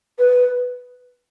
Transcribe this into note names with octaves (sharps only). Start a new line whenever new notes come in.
B4